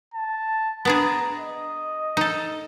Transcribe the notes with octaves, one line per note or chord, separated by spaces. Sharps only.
A5
B3 D4 G#4 A#5
D#5
D#4 A4